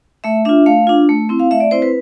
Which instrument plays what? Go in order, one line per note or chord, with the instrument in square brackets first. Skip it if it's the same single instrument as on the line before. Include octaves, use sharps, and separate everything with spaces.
[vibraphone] A3 E5
D4 F4 E5
A3 F5
D4 F4
A3
C4 E4
F5
A3 E5
D5
C4 E4 C5
B4